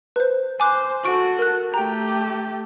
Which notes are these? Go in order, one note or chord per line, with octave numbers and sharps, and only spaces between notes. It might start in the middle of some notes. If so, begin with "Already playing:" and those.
B4 C5
C5 G#5 D6 F#6
F#4 A4 C#6 D7
A#4 F#6
A3 G4 G5 A#5